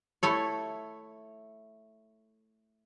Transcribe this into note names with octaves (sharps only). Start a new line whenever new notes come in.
A3 E4 A4 C#5